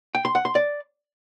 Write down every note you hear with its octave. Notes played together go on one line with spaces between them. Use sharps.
G5
C6
F#5
C6
D5